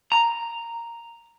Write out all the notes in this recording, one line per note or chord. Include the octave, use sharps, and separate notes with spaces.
A#5